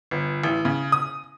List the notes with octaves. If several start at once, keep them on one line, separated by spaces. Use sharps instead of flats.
G1
A1
C#3
D#6